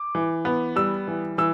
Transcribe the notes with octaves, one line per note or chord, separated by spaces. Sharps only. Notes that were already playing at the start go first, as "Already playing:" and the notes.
Already playing: D6
E3
B3
G3 E6
E3
E3 E6